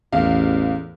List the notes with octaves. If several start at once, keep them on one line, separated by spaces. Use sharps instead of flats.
A1 E2 F5